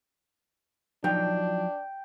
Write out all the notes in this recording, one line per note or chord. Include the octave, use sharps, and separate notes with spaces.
F3 F#3 D4 D#4 G5